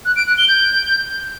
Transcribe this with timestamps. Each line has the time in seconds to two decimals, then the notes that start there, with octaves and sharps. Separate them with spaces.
0.05 F#6
0.16 D7
0.27 F#6
0.38 G7
0.48 G6